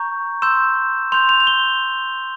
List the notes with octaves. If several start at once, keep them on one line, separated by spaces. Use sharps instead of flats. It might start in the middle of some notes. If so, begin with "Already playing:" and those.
Already playing: A#5 C#6 G6
C6 E6 G6 E7
C6 G6 F7
F7
F7
G7